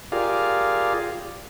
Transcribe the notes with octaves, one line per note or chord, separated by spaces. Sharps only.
F4 G4 G#4 A#4 D5 F5